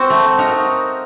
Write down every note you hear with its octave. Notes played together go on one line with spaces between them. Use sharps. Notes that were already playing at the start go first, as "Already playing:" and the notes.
Already playing: C4 F#4
A3
D#4 F#4 A#4